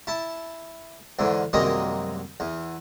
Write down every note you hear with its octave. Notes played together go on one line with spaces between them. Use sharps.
E4 A5
E2 G#2 D3
C2 F#2 D#3 G#3 A#3 D#5
E2